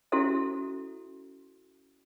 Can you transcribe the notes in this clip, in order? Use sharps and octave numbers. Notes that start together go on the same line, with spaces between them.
C#4 E4 F#4 A4 C5 E5